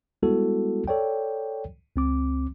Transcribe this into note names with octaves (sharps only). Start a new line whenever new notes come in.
G3 G#3 B3 E4 F#4 A4
A4 C#5 D5 G5
C#2 C4 D6